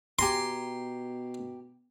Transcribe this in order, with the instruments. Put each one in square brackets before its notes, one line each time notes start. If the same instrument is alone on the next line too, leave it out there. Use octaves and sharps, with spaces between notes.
[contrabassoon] B2 [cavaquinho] G4 G#5 A#5 [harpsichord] C6